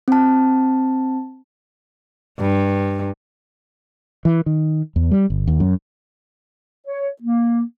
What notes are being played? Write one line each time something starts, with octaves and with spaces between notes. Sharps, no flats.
C4 A5
G2
E3
D#3
E2
G3
G1
D#2
F#2
C#5
A#3